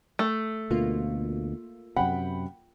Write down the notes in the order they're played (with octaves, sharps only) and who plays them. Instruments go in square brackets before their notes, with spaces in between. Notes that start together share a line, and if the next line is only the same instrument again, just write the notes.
[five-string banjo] A3
[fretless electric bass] D2 B2 [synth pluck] A#3 F4
[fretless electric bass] F#2 C3 [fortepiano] F#5 G5 B5